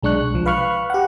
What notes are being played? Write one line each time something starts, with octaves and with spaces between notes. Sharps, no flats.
B1 G#3 D4 C#6 F#6
C2 F3
B4 F5 B5 C#6 F6 F#6
G4 F#5